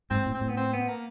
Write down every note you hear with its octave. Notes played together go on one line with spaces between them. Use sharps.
G#2 C4
A2
C4
A2
B3
C4
B3
A#3